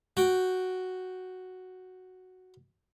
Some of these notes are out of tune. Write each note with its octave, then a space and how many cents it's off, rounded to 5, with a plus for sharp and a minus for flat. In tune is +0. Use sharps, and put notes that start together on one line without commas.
F#4 +0 G5 +0